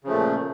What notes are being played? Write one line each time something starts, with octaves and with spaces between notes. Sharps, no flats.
A#2 C#3 F3 A3